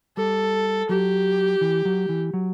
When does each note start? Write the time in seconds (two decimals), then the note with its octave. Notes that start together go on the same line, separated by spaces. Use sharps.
0.17 G3 A4
0.89 F#3 G4
1.61 E3
1.85 F#3
2.09 E3
2.34 F#3